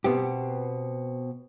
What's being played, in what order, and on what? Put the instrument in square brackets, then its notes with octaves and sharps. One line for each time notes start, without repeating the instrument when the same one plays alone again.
[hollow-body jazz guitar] B2 B3 C4 G4